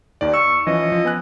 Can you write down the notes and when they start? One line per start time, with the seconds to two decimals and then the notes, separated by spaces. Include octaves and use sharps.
0.21 D#2 D#3 D5
0.34 C#6 E6
0.67 E3 F3 C#4 D#5
0.92 F3
1.05 B3 G#5 F#6